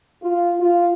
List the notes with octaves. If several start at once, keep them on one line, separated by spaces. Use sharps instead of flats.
F4
F4